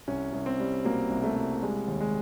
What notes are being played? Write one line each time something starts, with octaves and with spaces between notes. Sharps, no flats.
C2 C#4
C2
C4
G3
B2 A#3
C2
A3
C2
G3 G#3
D#2
G#3